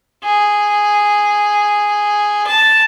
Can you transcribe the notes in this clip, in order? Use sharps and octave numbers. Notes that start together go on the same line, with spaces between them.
G#4
A5